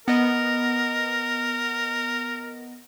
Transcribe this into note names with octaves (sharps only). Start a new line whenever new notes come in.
B3 A#4 D#5